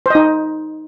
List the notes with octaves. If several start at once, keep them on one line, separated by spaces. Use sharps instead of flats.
D#4 C5 D#5